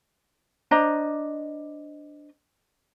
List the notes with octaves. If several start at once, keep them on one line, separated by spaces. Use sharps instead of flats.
D4 C5 D#5 A#5